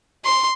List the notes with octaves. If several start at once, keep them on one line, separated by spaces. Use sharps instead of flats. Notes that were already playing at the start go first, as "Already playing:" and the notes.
C6